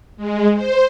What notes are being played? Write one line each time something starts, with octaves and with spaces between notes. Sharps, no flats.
G#3
C5